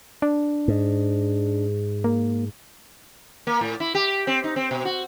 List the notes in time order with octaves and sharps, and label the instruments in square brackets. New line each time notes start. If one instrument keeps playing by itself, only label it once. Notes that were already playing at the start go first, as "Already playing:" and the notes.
[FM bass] D4
[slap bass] G#2
[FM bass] A#3
[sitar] A#3
A2
E4
G4
C4
D#4
C4
B2
F#4